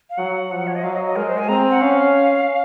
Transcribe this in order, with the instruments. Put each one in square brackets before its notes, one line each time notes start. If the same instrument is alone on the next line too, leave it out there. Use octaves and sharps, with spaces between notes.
[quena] F5
[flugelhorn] F#3 [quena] F#5
[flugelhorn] F3
[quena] C#5
D#5
[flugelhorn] F#3 [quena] F5
[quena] D#5
D#5
[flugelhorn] G#3 [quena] A#4
[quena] C5
G#5
[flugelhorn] C4 [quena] A#5
[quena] F#5
[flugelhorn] C#4 [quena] F5